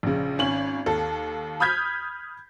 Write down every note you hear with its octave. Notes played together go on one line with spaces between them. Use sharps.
A#1 C#3
G#1 C#4 F#7
D#2 A4
B5 D#6 F6 G6 G#6 B6